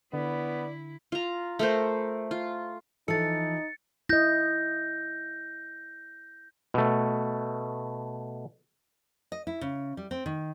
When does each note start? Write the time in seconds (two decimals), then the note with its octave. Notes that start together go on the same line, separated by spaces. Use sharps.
0.13 D3 B3 E4 D5
1.12 F4 A#5
1.59 A3 A#4 C5
2.31 F4
3.08 E3 F3 D#4 A4 A6 C#7
4.09 E4 D#5 G6 A#6
6.74 B2 A3
9.32 D#5
9.47 E4
9.61 C#3
9.97 G3
10.11 C4
10.26 D#3